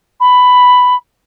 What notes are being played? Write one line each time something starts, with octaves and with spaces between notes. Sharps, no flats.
B5